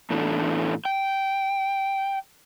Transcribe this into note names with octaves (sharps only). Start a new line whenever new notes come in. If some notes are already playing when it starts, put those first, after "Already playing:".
A2 E3 A3 B3 D4 A4
G5